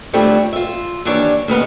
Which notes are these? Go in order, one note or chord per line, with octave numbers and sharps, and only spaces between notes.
D3 F3 G3 A3 C4 C#5
F4 E5
D#2 E3 D4 C#5
D#2 B2 B3 C#4